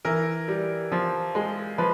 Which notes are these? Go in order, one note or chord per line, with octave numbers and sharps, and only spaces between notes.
E3 A#4
G3
F3
G#3
F3 B4